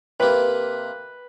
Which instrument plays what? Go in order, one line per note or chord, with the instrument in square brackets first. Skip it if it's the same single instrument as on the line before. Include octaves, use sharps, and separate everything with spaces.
[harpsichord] C3 A#3 [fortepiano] B4